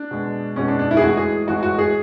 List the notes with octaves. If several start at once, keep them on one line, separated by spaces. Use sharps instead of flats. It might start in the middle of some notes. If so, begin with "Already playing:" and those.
Already playing: D4
B2 G#3
B2 G#3 C#4
D4
D4
E4
G#4
A2 E3 G#3 F#4
G#4
A2 E3 G#3 F#4
F#4
G#4